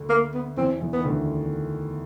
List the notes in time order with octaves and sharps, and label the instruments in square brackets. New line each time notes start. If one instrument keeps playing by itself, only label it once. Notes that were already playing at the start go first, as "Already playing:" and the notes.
Already playing: [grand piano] D2 D3
[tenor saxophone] A#3
B3
[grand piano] E2 E3 [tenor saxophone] C4
[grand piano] E2 E3
[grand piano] D#3 [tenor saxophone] B3
[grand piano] D2 D3